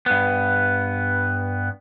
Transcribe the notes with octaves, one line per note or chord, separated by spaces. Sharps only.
G2 B3